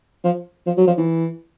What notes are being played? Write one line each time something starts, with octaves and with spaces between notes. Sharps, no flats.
F3
F3
F#3
F3
E3